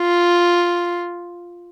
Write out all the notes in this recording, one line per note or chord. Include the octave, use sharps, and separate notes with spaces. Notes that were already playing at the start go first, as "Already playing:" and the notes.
Already playing: F4